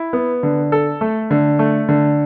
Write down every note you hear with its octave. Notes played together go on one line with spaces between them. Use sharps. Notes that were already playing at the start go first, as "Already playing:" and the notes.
Already playing: E4
B3
D3
A4
A3
D3
A3
D3